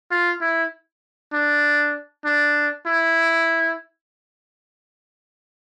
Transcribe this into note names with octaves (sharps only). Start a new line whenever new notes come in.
F4
E4
D4
D4
E4